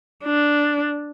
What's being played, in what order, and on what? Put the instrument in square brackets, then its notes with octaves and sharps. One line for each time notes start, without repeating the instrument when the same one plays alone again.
[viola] D4